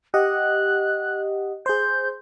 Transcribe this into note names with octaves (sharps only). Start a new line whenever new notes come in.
G4 D#5 F#5 F#6
G#4 C5 G6